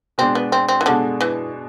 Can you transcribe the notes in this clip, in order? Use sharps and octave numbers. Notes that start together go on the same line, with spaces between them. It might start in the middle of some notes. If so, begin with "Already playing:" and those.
B2 G#3 C4 D4
B3
C4
C4
E3
B2 D3 G#3 D4
E3